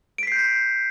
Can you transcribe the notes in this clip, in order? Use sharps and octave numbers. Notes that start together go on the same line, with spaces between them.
G6 B6 C7 D7